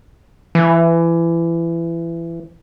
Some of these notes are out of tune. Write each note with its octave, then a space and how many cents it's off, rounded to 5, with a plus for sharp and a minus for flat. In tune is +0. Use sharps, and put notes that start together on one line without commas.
E3 +25